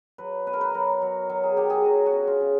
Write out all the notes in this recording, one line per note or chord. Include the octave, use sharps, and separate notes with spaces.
F#3 B4
B2 B4
A#4
B4
F#3 A#4
F#3
F#3
G#4
F#3 G4
G#4
F#3 F#4
F#4
C#3
F4
C#3